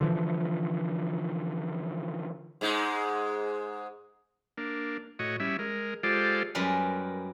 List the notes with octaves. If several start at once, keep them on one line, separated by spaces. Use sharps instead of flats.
D3 E3 F3
G#2 G#3 D#4
A#3 D4
A2 F#4 C#5 D#5
G3 C#4 E4 E5
G#3 A#4
G#3 F4 G4 A4 C5 D5
F#2 G3 G#3 A#4 B4